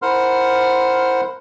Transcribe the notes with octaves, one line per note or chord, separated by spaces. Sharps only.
E4 A#4 C5 F#5 C6 F6